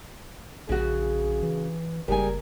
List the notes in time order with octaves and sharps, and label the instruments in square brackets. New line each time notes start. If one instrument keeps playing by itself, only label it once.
[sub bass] A#1 [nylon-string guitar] C#3 F#4 [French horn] G#4
[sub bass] E3
[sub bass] F#1 [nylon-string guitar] G3 G#4 G#5 [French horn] A#4